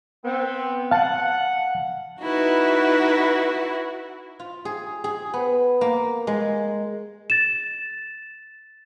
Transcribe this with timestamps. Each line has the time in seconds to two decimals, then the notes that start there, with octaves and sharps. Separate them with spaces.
0.24 B3 C4
0.91 F5 F#5 A5
2.21 D#4 E4 F#4 B4
4.40 F4
4.65 G#4
5.04 G#4
5.34 B3
5.81 A#3
6.27 G#3
7.30 A6 E7